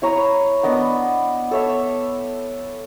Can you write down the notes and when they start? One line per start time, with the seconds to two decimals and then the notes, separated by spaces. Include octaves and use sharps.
0.02 E4 C#5 A#5 D#6
0.63 B3 D4 D#5 F#5
1.51 A4 C#5 E5